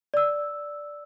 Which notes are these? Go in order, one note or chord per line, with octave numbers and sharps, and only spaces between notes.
D5 E6